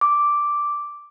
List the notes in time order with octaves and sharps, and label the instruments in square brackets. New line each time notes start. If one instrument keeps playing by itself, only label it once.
[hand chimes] D6